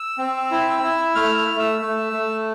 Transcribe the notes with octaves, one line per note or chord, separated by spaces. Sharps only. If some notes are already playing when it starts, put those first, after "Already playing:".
Already playing: E6
C4
E4
E4
A3 F6
E6
F6
A3
E6
A3
A3